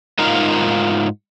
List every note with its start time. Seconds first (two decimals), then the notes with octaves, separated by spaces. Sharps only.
0.19 G#2 D#4 F4 A#4 F5